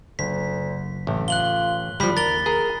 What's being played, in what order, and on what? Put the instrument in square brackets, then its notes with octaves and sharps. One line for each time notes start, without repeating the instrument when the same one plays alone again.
[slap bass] F#1 [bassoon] D2 [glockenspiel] B6
[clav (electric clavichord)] A1 [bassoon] A3
[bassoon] F4 [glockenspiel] F#6 F#7 G7
[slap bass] F#1 [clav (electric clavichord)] F3 G3 [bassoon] D4 [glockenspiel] B5 B6
[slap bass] D#2 [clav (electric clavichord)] A#4 [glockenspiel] A6 G7
[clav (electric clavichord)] G#4 [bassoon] A#4